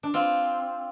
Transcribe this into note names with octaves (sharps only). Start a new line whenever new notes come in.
D4
C4 F4